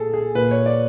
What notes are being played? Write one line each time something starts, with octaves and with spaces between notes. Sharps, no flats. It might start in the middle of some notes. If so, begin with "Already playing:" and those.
Already playing: A#2 G#4 A4
G#4
A#2 B4
C#5
D5